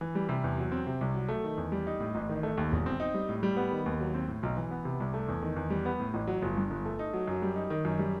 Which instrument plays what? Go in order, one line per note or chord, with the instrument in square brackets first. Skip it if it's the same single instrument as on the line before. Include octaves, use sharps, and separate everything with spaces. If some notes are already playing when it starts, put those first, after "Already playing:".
[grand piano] E3
G3
C3
E2
F#3
C4
C3
C2
F#3
A3
D#3
E2
G3
D#4
A2
A1
D#3
A3
D#2
E1
C4
D#4
G3
A2
G3
B3
D#3
D#2
F#3
C4
A2
B1
E3
B3
C3
C2
A3
E2
D#3
E2
G3
B3
A2
A1
F#3
G1
G2
G1
A3
D#4
F#3
F#2
G3
D#4
D#3
F#2
G3